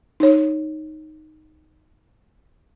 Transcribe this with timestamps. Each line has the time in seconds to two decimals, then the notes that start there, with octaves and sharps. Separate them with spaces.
0.20 D#4 C#5